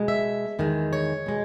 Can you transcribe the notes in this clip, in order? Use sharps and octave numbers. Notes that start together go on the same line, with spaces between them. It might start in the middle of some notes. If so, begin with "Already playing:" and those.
Already playing: B2 G#3
E5
E2 D#3 G#3
C#5
B2 G#3